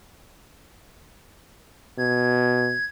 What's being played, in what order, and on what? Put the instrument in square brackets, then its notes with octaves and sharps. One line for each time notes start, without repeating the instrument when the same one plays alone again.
[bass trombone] B2 [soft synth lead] G#6